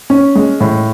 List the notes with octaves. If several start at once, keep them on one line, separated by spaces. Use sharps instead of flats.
C#4
G#3
A2